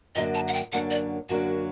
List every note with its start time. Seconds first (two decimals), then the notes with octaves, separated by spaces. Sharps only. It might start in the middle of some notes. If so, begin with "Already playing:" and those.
0.15 F#2 D3 F#3 A#3 D4 D#5
0.34 A5
0.48 F#5
0.53 G5
0.72 F#2 D3 F#3 A#3 D4 F#5
0.91 D5
1.29 F#2 D3 F#3 A#3 D4 F#4